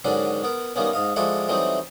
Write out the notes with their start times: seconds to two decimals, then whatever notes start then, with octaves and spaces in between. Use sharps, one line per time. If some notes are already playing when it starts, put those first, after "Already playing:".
0.04 G#2 D3 D#3 F#3 C#4 D4
0.44 B3 A#4
0.76 D#3 G3 A#3 B3 C#4
0.93 G#2 D#5 F5
1.16 F3 G#3 E4 F#4 A4 D5
1.48 E3 F#3 G3 A3 C4 D#4